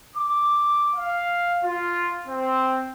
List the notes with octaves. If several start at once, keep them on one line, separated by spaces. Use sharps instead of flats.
D6
F5
F4
C4